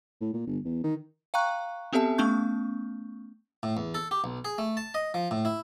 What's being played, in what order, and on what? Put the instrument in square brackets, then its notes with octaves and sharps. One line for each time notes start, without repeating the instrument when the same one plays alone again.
[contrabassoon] A2
A#2
G1
E2
D#3
[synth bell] F5 G5 A#5 C#6 F#6
B3 C4 G4 A4 E5 A5
A3 B3 C#4 C#6 G6
[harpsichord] A2
E2
A4
G4
B1
G#4
A3
A5
D#5
F3
A2
E4